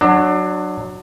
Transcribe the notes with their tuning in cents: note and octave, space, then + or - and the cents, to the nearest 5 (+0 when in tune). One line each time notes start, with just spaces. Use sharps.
F#3 +0 D4 +25